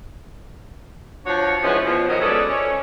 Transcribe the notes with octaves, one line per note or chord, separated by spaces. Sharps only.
F3 D4 F#4 C#5
E3 F3 G#3 B3 C#4
B2 F3
D#3 F#3 C#4 D#5
G#3 C#4 G#4 A4 B4 D5
C#4